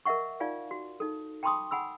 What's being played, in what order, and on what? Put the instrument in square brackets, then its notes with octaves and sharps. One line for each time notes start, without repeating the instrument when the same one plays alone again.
[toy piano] A#4 D#5 E5 F#5 C#6
D#4 F4 D5 F5 G#5
F#4
D#4 A4
G5 A5 B5 C6 D6 D#6
F#5 G#5 B5 E6